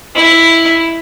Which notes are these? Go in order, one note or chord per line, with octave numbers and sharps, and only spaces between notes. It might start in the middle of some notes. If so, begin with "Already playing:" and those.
E4